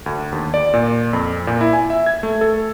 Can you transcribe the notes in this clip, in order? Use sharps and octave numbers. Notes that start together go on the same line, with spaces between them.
D2
D#2
D5
A#2
F2
A#2
E4
G#5
E5
G#6
A3
A4